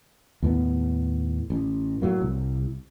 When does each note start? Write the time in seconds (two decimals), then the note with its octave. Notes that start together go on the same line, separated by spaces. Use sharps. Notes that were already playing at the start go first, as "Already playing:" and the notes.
0.43 D#2 A2 B3
1.50 A1
2.02 A2 F#3 A#3
2.21 C2